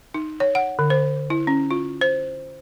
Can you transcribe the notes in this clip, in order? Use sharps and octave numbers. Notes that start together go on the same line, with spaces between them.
D#4
C#5
F#5
D3
C5
E4
C#4
F4
C5